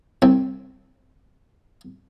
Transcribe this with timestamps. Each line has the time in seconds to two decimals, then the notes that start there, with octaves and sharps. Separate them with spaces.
0.22 C2 C4